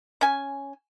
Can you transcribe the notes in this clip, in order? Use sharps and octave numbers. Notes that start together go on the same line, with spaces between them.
C#4 G#5